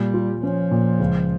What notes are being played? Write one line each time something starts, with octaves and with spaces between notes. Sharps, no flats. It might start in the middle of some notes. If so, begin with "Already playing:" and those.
Already playing: A#2 G3
F4
F3 C#4
A#2
C#2